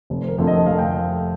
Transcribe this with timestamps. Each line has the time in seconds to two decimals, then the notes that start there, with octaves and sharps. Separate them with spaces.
0.10 F1
0.22 C5
0.29 A#4
0.38 F2 D3 F3 A3
0.47 D#5
0.66 F1 F5
0.79 G5